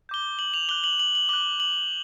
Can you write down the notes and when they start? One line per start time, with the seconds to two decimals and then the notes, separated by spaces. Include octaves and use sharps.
0.09 D6 G6 G7
0.39 F#7
0.54 F7
0.69 D6 F#6 G7
0.84 F#7
0.99 F#7
1.15 F#7
1.29 D6 F#6 G7
1.60 F#7